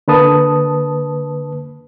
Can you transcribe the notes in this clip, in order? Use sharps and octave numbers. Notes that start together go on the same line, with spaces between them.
D3 A#3 B4 A5 D#6